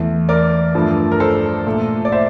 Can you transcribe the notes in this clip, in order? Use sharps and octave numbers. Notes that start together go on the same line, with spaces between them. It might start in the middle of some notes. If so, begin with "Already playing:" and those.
Already playing: E2 E3 A3
A#4 D5
G2 F3 A3
A#4
A4 C5
A#2 A3
D5
C5 E5